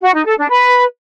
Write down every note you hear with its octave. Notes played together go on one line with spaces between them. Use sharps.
F#4
D#4
A4
D4
B4